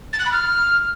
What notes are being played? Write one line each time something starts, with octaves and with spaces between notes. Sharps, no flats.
A6
F#6
B5
F6